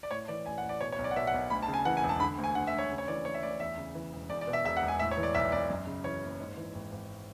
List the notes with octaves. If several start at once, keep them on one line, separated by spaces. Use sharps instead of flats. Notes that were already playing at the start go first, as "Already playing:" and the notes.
D5
A2 C#5
E3 D5
A1 G#5
F#5
A1
D5
B2 C#5
C#5
B1
D5
F#5
B2 E5
F#5
B1
D2 B5
A5
C#3
G#5
E3 F#5
G#5
E1
A5
D3 B5
D2
G#5
D3 F#5
E5
D2
C#5
C#3
C#5
E3 D5
D2 C#5
E5
D2 D5
E2 E5
C#3
E3
E1
E2 D5
D5
B2
E5
E1 E5
F#5
E1
G#5
A2 E5
C#5
E3
D5
B1 E5
B1 D5
F#2
C#3
E3 C#5
F#1
G#2
E3
G#1
G#1